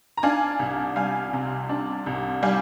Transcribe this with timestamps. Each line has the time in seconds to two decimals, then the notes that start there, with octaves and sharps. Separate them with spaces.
0.17 A#5
0.23 D4 F5 G#5
0.59 C2
0.96 G3 F5 G#5
1.33 C3
1.69 D4
2.06 C2
2.43 G3 F5 G#5